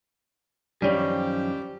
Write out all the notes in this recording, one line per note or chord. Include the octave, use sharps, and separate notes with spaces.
F#2 D#3 F3 G3 C#4 G4